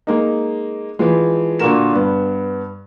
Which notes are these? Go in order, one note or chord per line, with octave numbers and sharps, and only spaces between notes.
G#3 A#3 D#4
E3 F3 G#3
A#2 D3 A#3 F#4 A#4 E7
G2 B3